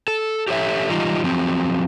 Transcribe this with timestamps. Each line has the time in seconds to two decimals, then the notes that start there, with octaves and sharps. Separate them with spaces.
0.08 A4
0.48 G4 A4 C#5 E5
0.90 E3 G3 D#4 F4
1.24 F3 F#3 C4 G#4